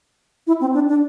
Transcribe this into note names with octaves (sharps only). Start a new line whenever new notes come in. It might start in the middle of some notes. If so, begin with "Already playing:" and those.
E4
C4
D4
D4